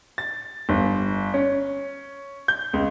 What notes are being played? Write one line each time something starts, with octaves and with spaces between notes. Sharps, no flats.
A6
G1
C#4
G6
C#2